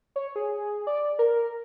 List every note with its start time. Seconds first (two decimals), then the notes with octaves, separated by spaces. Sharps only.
0.16 C#5
0.36 G#4
0.87 D5
1.19 A#4